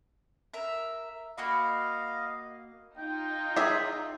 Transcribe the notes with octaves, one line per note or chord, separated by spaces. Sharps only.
A#4 E5
A#3 F#4 D#5 F5 B5
D#4 F4 G5
G#4 E5